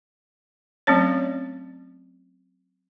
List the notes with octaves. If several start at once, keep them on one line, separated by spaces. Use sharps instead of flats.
F#3 A3 C4 C#4 C#5